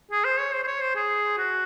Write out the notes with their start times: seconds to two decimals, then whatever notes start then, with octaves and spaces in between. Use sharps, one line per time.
0.11 G#4
0.25 C5
0.39 C#5
0.53 C5
0.63 C5
0.67 C#5
0.81 C5
0.95 G#4
1.38 F#4